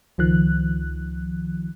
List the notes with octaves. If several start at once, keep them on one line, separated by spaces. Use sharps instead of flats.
C#2 D#3 F3 F#6